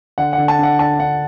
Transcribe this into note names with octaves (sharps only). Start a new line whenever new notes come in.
D3 F#5
D3 F#5
A5
D4 F#5
D3 A5
D4 F#5